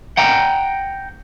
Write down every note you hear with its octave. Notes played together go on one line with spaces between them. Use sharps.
F#5 G5 A#5